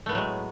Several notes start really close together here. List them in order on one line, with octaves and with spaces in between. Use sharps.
A3 B3 A2 F#3 G#3